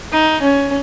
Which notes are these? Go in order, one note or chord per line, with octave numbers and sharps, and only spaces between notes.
D#4
C#4